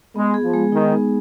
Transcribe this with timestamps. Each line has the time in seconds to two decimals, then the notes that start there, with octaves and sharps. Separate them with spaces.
0.16 G#3 B3
0.34 G#4
0.44 F3
0.54 G#3
0.72 D#3 D#4
0.92 B3